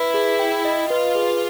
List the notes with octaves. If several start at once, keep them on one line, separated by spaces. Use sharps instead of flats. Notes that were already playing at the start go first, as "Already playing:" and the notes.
Already playing: E4 B4
G#4
G5
D#5
F4 B4
G#4